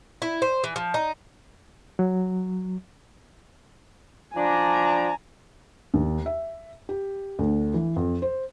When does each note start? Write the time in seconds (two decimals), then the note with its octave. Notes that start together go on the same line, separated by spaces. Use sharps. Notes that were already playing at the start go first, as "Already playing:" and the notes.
0.22 E4
0.42 C5
0.64 E3
0.76 F3
0.94 D#4
1.99 F#3
4.35 F3 D4 G#5 A#5
5.94 D#2
6.26 E5
6.89 G4
7.39 D2
7.74 E3
7.96 F2
8.22 C5